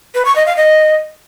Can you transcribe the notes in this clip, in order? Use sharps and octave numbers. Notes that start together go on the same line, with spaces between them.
B4
C#6
D#5
F5
D#5